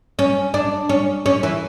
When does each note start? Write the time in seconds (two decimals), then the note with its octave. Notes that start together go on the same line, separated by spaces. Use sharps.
0.19 C#4
0.54 D4
0.89 C#4
1.26 C#4
1.43 E3